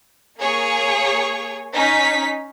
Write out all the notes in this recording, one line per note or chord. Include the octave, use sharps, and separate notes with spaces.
A#3 G#4 C#5
C#4 D#4 B6